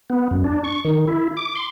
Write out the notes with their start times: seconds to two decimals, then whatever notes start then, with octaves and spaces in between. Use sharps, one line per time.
0.10 B3
0.31 F#2
0.44 D4
0.64 C#6
0.85 D#3
1.08 E4
1.37 D6
1.55 C6